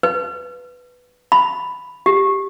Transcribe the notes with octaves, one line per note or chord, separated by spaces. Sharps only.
B4
B5
G4